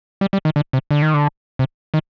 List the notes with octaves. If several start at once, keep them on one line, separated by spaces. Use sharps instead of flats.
G3
G3
D#3
D3
C3
D3
D#3
D3
C3
D#3